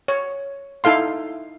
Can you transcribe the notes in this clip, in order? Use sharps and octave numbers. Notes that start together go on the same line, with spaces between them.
C#5
D#4 E4 A4 F5 C6